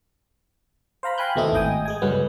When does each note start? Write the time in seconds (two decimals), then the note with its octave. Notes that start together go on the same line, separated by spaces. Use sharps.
1.03 C5 F5 A#5 B5
1.18 F5 G5 G#5 B5 F#6 G6
1.36 D#2 B2 A3 C4 E4 D#5
1.53 G#1 A2 D#5 G5 G#5 D#6
1.85 G#3 G#4 G#5
2.02 C#2 G2 D3 F#3 G#3 B3